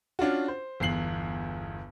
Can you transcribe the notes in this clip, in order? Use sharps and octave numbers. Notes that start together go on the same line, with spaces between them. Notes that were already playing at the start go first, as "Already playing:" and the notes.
C#4 D4 F4 F#4
C5
G1 E2 C7 F#7